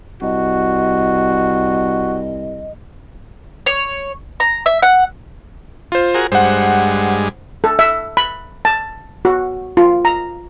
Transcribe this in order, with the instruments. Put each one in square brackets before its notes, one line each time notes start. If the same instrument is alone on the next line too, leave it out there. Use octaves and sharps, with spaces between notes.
[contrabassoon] C2 [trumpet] F#4 [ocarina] D#5
[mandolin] C#5
A#5
E5
F#5
[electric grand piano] F4 C5
[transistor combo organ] F#4 G#4 A#4
[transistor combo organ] G2 G#3 [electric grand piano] C5 F#5
[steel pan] A4
E5
B5
A5
F#4
F4
A#5